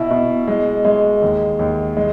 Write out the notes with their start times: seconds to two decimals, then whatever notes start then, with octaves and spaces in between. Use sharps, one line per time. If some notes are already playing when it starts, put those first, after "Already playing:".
Already playing: B2 E4
0.10 B2
0.48 G#3
0.85 G#3
1.22 D#2
1.59 D#2
1.97 G#3